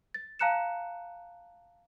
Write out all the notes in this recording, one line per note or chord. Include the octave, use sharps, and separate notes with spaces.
A6
F5 A5 A#5 F#6 C#7 E7